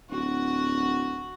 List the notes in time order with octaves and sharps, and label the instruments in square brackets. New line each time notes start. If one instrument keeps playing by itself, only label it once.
[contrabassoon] D1 [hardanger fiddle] F#4 F#5